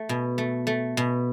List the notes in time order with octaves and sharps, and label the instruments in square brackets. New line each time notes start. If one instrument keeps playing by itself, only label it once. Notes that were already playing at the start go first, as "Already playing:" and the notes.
Already playing: [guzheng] A3
B2
A3
A3
B2